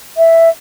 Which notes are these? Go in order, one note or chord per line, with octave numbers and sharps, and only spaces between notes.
E5